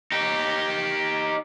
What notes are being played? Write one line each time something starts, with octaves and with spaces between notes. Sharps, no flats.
D#4 G4